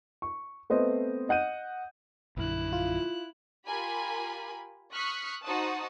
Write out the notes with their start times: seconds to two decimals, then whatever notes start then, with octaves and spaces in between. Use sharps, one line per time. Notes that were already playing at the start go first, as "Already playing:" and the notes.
0.22 C#6
0.70 A3 B3 C4 C5 D#5
1.29 D#5 F#5 G6 D#7
2.37 A#1 F#2 D3 E4 F#6
2.73 F4
3.67 F4 G4 A#4 G#5 B5
4.93 C#6 D#6 F6 F#6 B6 C#7
5.43 D#4 F#4 C5 F#5 A5 D#6